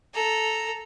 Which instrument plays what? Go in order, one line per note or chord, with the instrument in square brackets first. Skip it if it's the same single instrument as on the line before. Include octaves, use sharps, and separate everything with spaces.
[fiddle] A4 A#5